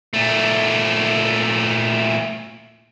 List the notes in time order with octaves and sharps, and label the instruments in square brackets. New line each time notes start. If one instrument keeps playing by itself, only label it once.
[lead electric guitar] A#2 A3